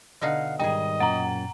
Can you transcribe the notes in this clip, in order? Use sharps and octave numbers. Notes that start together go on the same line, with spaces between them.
B2 D3 D#4 D#5 F5 F#5
G#2 D#3 G3 D#4 G#4 D#5 G5
F#2 A#2 F#5 A#5 A6